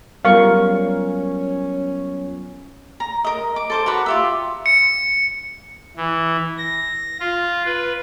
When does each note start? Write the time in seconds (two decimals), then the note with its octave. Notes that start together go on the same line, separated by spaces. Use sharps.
0.25 F#3 G3 B3 C#4 F4 A#4 F5 C#6
3.00 A#5
3.24 A#4 D#5
3.56 D6
3.70 A4 C5 D6
3.86 F#4 A#4 B4 F#5
4.06 F4 G4 E5
4.66 C#7
5.96 E3
6.58 A#6
7.20 F4
7.66 B4